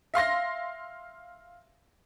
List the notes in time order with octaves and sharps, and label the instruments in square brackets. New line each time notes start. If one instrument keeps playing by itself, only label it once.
[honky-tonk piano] E5 F5 C6 A#6